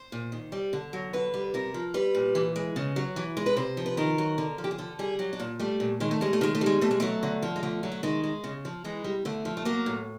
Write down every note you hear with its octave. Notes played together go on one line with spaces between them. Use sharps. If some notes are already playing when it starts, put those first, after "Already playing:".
Already playing: C5
A#2
D#3
G3
D3
F#3
D3 B4
G3
C3 A#4
F3
G3 B4
A#2
E3
G#3
C#3
F#3
E3
G#3
B4
C3 C5
F3
B4
D#3 A#4
F#3
D3
F3
G4
G#4
D3 A4
G3 G#4
F#3 G4
D4
A#2
G3 A3
A#2
D#3 G#3
A3
G3 G#3
A3
D#3 G#3
A3
G3 G#3
B2 A3
G#3
F#3 A3
D3
F3
G#3
D3 A3
F#3
A3
D#3 G#3
G#3
C#3
F3
E3 G#3
G3
D3 A3
F3
A3
F#3 A#3
A2